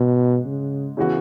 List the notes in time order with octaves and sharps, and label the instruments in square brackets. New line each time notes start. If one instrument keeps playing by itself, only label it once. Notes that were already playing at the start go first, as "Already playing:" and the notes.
Already playing: [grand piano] G#2 G#3 [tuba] B2
[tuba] C#3
[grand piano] C#3 E3 B3 F#4